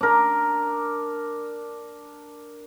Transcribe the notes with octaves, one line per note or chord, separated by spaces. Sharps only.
D4 A#4